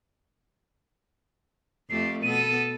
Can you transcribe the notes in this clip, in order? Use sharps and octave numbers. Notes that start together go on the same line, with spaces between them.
F2 A3 G4 C7
B2 B3 A4 D#7